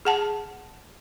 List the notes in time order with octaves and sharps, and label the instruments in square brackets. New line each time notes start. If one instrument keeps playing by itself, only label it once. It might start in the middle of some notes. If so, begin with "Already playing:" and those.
[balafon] G#4 F#5 A5